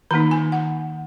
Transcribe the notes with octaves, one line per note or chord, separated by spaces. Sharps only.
D#3 A#3 D#4 A#5
G#5
F#5